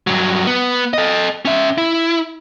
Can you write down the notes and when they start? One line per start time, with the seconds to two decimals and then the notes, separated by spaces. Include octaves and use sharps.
0.07 G2 F#3
0.47 B3
0.93 A4 D#5
1.45 C#4 E5
1.78 E4